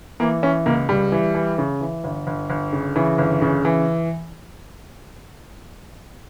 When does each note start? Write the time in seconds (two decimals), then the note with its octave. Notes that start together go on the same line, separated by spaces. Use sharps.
0.20 E3 A#3
0.43 E3 C#4
0.66 C#2 A#3
0.89 C#2 G3
1.12 E3
1.35 E3
1.58 C#3
1.81 E3
2.04 G1
2.27 G1
2.50 G1
2.73 C#3
2.96 C#3 E3
3.18 G1
3.41 C#3
3.65 E3